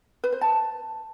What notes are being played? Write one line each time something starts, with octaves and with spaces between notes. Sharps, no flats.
B4
C5
A5